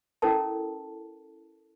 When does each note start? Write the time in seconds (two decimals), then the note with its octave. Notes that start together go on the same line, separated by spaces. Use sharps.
0.22 C#4 E4 A4 A#4 A5